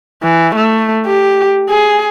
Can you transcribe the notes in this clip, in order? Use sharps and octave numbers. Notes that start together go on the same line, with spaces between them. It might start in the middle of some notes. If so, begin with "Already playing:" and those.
E3
A3
G4
G#4